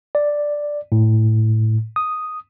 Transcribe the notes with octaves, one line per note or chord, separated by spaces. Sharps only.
D5
A2
D#6